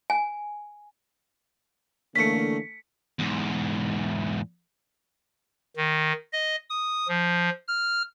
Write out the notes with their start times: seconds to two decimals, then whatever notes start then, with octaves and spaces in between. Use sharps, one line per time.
0.10 G#5
2.16 D3 E3 A3 A#3 C#4 B6 C#7
3.19 E2 G#2
5.77 D#3
6.33 D#5
6.70 D#6
7.08 F3
7.68 F6